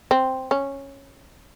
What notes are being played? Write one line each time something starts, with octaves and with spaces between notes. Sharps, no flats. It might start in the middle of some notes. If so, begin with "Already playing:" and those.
C4
C#4